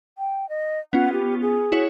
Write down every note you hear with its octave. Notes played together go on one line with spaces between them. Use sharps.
G5
D#5
B3 C#4 F4 F#5
G4
G#4
E4 F#4 C#5